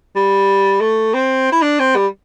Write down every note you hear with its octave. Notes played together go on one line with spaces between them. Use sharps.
G3
A3
C4
E4
D4
C4
G3